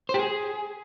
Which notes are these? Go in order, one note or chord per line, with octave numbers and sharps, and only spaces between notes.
C5
G4
G#4